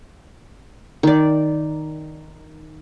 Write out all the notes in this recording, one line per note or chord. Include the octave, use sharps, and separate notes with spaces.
D#3 D5